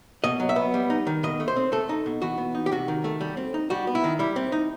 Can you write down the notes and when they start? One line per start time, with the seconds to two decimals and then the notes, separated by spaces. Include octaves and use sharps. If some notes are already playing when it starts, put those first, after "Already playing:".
0.24 B2 D#5
0.40 F#3
0.49 E5
0.56 B3
0.74 G3
0.90 D#4
1.07 D#3
1.23 B2 D#5
1.40 A3
1.48 C5
1.56 C4
1.72 A3 A4
1.89 D#4
2.06 B2
2.22 E3 F#4
2.38 B3
2.55 D#4
2.66 G4
2.71 C3 F#4
2.88 D#3
3.04 A3
3.21 G3
3.37 C4
3.54 D#4
3.70 G3 F#4
3.87 B3
3.95 E4
4.04 D#3
4.19 G3 E4
4.36 C4
4.52 D#4